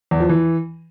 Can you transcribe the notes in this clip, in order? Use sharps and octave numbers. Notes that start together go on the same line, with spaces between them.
E2
F3
E3